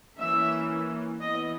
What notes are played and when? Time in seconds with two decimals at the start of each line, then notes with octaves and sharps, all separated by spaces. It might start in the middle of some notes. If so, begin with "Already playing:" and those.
0.17 E3 A#3 C#4 E5
1.20 E3 B3 D#5